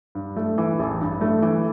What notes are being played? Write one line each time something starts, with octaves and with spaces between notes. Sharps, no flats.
G2
A3
E3
A1
G2
A3
E3